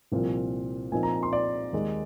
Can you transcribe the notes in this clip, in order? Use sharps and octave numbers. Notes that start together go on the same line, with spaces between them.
C2 A#2 F3 C4 F4
A#2 F3 C4 D#4 G#5
A#5
C6
D5
D#2 D#3 G#3